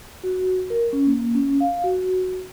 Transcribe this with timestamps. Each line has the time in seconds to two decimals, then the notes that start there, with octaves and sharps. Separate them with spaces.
0.24 F#4
0.70 A#4
0.93 C#4
1.07 A#3
1.35 C#4
1.60 F5
1.84 F#4